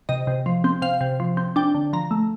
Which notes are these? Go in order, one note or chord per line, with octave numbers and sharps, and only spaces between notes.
C3 D#5
C3
F3
C4
C3 F5
C3
F3
C4
D4 G5
D3
F3 A#5
A3